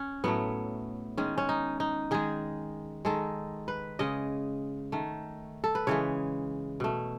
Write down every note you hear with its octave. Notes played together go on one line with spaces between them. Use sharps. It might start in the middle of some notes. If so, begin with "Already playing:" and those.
Already playing: C#4
A2 F#3 A3 B3
D#3 G#3 C#4
C#4
D#4
D#4
D#3 G#3 G#4
D#3 G#3 A4
B4
C#3 G#3 D#5
D#3 A3
A4
B4
C#3 E3 G#3 C#5
B2 A3